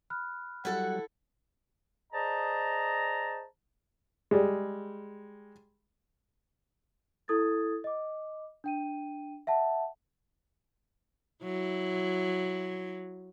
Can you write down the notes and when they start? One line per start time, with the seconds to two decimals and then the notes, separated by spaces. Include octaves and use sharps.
0.10 B5 F6 F#6
0.65 F#3 G3 E4 A4 F#5
2.13 G#4 C5 D5 D#5 A5 A#5
4.31 G3 G#3
7.28 E4 A4 D#6 G#6 A6
7.84 D#5 D6
8.64 D4 G5 D#7
9.47 E5 F#5 A5
11.43 F#3 E4